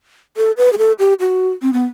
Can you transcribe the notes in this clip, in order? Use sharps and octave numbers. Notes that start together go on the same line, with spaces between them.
A4
B4
G#4
A4
G4
F#4
C4
B3